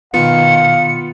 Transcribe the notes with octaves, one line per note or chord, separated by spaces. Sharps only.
B2 D#3 B3 F4 F5 C#7